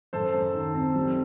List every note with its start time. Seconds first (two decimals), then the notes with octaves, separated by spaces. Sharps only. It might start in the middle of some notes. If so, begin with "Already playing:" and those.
0.13 F#2 A4 C5
0.34 F#2
0.55 D#3
0.75 C4
0.96 G3